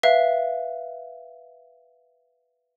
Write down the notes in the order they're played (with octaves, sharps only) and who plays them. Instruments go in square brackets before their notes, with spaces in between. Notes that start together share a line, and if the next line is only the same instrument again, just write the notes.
[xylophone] B4 E5 F5